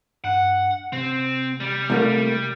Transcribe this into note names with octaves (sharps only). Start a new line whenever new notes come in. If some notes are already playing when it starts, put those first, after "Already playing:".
G2 F#5
C3 C4
G3
C2 A3 A#3